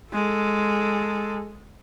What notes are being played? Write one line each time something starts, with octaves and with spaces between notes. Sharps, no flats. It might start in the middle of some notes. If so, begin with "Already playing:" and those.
G#3 A4